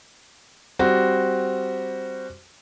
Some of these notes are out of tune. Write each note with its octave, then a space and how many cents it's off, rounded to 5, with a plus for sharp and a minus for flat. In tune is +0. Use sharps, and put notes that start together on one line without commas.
G3 +0 C4 +0 F#4 +0